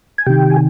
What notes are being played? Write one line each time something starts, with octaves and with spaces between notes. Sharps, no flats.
G#5
C3 D#3 G4 G5
G#5